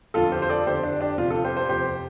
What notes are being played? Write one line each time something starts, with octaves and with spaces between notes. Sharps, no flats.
F2 D3 F4 A4
G4 C5
C5
A4 D5
F2 D3 G4 C5
D4
D4 G4
F2 C3 F4
F4 A4
G4 C5
G4 C5
F2 C3 G4 C5